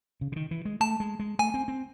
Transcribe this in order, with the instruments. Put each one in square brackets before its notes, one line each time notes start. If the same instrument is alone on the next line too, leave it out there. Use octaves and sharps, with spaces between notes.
[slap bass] C#3
C#3
D#3
E3
G#3
[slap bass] A3 [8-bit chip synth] A5
[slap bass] G#3
G#3
[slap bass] A3 [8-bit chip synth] G#5
[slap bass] C4
C4